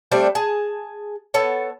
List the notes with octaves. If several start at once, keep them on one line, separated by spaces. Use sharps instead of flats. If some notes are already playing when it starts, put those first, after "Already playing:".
G3 A3 C4 D4
G#4 A5
B3 A4 C#5